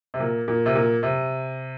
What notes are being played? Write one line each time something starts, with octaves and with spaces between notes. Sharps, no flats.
C3
A#2
A#2
C3
A#2
C3